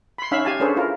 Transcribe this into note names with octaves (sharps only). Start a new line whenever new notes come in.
B5 C6
C#4 D#4 E5 F5 B5
G4 F5 G#5 A5
C#4 D4 G#4 A4 B4 C5
E4 F4 A#4